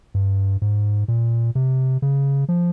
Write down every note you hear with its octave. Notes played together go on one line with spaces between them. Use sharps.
G2
G#2
A#2
C3
C#3
F3